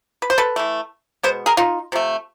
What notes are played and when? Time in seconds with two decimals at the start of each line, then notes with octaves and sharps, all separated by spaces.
0.22 B4
0.30 C5
0.38 A4 B4
0.56 E3 A3
1.23 B2 G#3 B3 C5
1.46 G#4 A#4
1.57 D#4 F4
1.92 C3 F3 A3